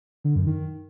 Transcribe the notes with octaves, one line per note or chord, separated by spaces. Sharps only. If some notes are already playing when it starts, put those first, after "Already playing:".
D3
F#2
D#3